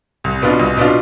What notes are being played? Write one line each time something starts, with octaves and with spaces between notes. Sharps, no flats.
C2
B2 B3 D4 F4
C2
B2 B3 D4 F4